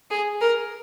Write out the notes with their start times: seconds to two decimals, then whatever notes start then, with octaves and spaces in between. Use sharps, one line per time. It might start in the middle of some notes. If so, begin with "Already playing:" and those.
0.11 G#4
0.41 A#4